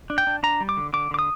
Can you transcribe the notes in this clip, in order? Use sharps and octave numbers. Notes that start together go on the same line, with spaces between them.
D4
G5
D4
D4 A#5
G3
D6
D3
D3 D6
D3 D6
D#6